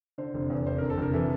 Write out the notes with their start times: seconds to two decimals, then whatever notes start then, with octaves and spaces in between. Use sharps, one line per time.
0.18 D3 C5
0.34 F1
0.50 E2
0.67 F1 C5
0.78 D3 A#4
0.90 A4
0.97 F1 A#4
1.13 E3 A4